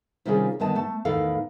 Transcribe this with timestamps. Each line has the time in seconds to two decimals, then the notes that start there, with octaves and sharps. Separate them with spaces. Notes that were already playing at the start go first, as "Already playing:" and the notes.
0.25 C3 D#3 G3 C#4 F4 G#4
0.60 G2 D3 D#3 B3 D#5 A5
0.75 A3 A5
1.05 E2 A2 D#3 B3 A4 F5